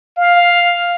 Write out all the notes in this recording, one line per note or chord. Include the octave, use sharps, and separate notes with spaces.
F5